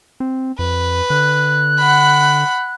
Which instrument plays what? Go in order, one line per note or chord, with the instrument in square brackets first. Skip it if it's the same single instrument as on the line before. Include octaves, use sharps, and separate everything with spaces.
[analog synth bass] C4
[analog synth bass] F2 [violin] B4
[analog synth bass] D3 [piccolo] F#6
[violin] F#5 B5